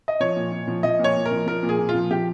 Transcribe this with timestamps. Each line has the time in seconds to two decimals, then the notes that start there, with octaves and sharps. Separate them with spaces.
0.08 D#5
0.20 F3 C#5
0.36 A#2
0.52 A#2
0.67 F3
0.83 F3 D#5
0.99 A#2 C#5
1.16 A#2
1.26 A#4
1.31 F3
1.46 F3 A#4
1.63 A#2
1.69 G#4
1.79 A#2
1.89 F4
1.95 F3
2.11 F3 G4